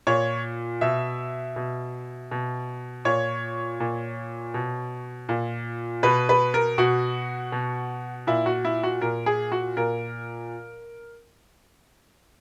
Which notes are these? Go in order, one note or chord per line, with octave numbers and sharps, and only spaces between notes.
A#2 C#5
B2 E5
B2
B2
A#2 C#5
A#2
B2
A#2
B2 B4
B4
A#4
B2 F#4
B2
A#2 E4
F#4
E4
F#4
A#2 A#4
G#4
F#4
A#2 A#4